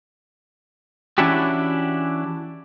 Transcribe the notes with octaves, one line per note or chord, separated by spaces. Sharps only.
E3 C#4 D4 E4 F#4 G4